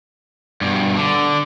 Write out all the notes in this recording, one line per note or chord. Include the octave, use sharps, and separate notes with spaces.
G2 B2
D3